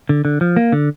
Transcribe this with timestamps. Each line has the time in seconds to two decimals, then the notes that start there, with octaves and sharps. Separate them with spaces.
0.09 D3
0.25 D3
0.41 F3
0.57 A#3
0.72 D3